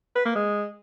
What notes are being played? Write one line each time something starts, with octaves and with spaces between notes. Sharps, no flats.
B4
A#3
G#3